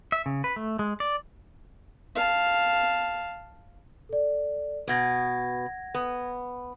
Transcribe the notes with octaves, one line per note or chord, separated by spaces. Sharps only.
E5
C#3
B4
A3
G#3
D5
F5 A5
A4 D5
B2 B3 F#5 G#6 A#6
B3